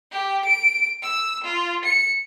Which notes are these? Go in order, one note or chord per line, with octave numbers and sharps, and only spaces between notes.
G4
D7
E6
F4
C#7